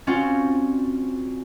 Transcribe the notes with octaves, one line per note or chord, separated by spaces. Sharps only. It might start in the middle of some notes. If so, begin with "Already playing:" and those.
C4 C#4 F4 F#4 C5 D5